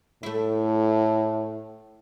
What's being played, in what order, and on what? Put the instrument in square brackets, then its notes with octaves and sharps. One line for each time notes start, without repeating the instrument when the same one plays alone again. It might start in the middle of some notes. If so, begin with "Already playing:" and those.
[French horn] A2 [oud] A3 E4